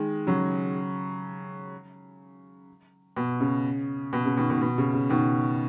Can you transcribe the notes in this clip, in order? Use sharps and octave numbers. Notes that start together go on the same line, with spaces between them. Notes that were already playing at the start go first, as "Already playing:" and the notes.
Already playing: D#3 G#3
C#3 F#3
B2
C#3
B2
C#3
B2 D#3
B2 D#3
B2
C#3
C#3
B2 D#3